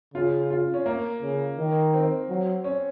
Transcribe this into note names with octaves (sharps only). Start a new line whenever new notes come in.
C#3 F4
F4
C#4
A#3
C#3
D#3
C4
F#3
C#4